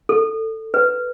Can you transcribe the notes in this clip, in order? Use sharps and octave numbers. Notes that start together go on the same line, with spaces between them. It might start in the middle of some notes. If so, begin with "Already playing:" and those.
A4
B4